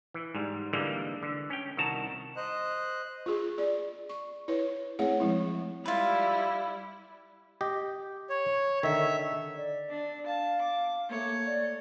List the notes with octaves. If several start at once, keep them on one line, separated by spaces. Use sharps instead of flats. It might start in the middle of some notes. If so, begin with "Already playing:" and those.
E3
G#2 G3
D3 E3 G3 G#3 A#3
D3
C#4 G5
C2 D#3 F#4 A5 A#5
C5 D#5 F#6
F4 G#4
G#4 D5
C#6
E4 B4 C#5
A3 C4 E4 G#4 C#5 F#5
F3 G#3 E4
G3 E4 F4 B4
G4 D#5
C#5
D3 D#3 E5
D5
D4
F5 A5
D6
A3 A#3 C#5
D5